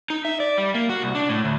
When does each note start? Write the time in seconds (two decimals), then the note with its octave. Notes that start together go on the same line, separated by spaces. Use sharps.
0.10 D#4
0.25 E5
0.40 D5
0.58 G3
0.75 A#3
0.89 F#4
1.02 C2
1.15 D4
1.29 A2
1.44 D2